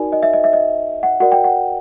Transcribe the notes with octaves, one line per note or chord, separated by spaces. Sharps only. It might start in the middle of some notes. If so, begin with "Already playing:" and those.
Already playing: D#4 F#4 A#4 D5 G#5
D#5
E5
D#5
E5
D#5
F#5
F#4 A#4 D5 F#5
G5
F#5